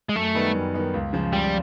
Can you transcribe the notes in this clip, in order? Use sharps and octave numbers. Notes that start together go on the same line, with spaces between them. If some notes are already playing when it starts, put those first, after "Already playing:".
G#3
F#2 A3
D#3 G3 B3 D#4
F#2
D#3 G3 B3 D#4
C#2
C#3 F3
C#2 G3